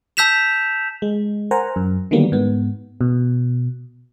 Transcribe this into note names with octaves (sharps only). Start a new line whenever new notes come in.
A5 E6 G6 B6 E7 F7
G#3
A#4 C5 F#5 G#5 A#5
F#2
D3 D#3 F#3 G3 A#3 B3
G#2 B3
B2